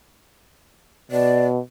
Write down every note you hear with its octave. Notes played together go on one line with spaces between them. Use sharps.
B2 D5